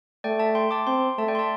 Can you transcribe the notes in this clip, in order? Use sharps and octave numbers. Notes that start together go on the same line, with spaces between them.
A3 D5 G5
E5 A5
G5 C6
A5 D6
C4 G5 C6
A3 E5 A5
D5 G5
C6
E5 A5